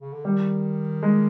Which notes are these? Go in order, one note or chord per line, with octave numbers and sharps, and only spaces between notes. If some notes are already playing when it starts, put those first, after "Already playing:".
C#3
D3
D#3 G3
G#3